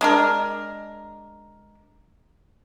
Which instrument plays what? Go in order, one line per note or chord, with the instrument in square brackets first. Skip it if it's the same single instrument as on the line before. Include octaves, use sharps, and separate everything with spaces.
[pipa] G#3 D4 A#4